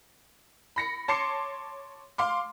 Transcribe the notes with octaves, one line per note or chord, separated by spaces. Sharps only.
B5 A#6 C#7
C#5 A5 C6 D6 C7 C#7
F5 C6 D6